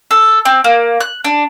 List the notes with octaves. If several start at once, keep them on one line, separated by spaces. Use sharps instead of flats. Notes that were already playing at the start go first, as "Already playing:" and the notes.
A4
C4
A#3
F#6
D4